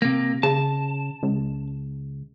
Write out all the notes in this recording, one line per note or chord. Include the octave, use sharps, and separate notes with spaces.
C3 A#3
C#3 A5
C#2